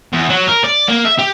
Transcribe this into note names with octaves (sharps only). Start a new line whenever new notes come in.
E2
F#3
A#4
D5
A#3
E5
G4